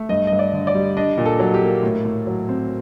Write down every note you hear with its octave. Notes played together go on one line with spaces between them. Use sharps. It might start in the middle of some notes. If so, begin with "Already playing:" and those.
Already playing: A3
G2 D#5
G2 D#5
D5
D3
D5
G3
D4 D#5
A#2
A4
F#3
G4
A#3
A2
A2
F#3
C4